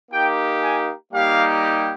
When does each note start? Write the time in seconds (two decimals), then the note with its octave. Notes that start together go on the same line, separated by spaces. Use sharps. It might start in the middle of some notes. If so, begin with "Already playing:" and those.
0.11 A#3 D#4 G4 G5
0.62 G#5
1.13 G3 A#3 D#4 G4 F5